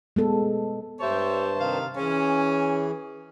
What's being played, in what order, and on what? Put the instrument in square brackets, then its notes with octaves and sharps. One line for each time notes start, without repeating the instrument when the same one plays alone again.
[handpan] G#3 B3 A4
[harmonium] G2 C5 A5 [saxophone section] G4 C#5 E5
[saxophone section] C3 D#3 F5
[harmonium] E3 G#4 [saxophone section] C#4